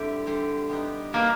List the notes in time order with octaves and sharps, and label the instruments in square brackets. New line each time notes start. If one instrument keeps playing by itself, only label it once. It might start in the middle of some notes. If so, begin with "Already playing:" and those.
Already playing: [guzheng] D3 G3 C4 E4 G4
D3 G3 C4 E4 G4
G3 B3 D#4 G4
[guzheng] G3 B3 D#4 G4 [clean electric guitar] A#3